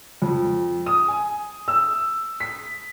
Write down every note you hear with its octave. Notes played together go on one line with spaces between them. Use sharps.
F2
D#6
G#5
E6
B6